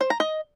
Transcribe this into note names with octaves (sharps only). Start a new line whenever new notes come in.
C5
A#5
D#5